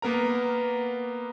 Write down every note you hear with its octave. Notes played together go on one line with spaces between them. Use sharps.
A#3 B3 A#4 A#5